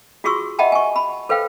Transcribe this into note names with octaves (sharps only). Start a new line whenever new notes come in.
F4 F#4 G#4 C6 C#6 E6
D#5 E5 F#5 G5 A5 B5
G#5 C#6
B5
A4 B4 C5 F5 G5